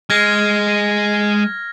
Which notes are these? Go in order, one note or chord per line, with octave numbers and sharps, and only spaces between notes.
G#3 F6 G#6 A#6